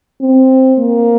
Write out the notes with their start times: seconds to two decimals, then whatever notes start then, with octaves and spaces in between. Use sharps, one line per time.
0.21 C4
0.79 A#3